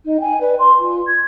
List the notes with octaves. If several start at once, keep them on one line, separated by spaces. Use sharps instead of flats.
D#4 D#5
G5 G#5
B4 D5
C6
F4
G#6